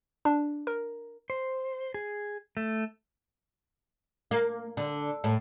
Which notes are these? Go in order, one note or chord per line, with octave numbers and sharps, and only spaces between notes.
D4
A#4
C5
G#4
A3
A#3
D3
A2